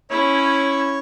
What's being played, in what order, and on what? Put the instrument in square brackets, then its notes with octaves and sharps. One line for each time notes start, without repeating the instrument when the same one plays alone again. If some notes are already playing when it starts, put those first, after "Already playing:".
[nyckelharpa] C#4 E4 [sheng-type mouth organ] C#5